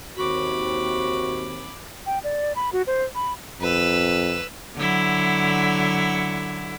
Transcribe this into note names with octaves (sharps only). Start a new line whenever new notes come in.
D#2 C4 F#4 B5 D6
G5
D5
B5
F#4
C5
B5
F2 B4 E6
D3 F#3 E4